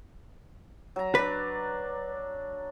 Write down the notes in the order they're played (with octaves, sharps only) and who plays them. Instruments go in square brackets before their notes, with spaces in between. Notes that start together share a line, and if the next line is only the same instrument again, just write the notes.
[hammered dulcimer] F#3 A#5
[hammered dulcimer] D4 D5 [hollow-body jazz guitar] B4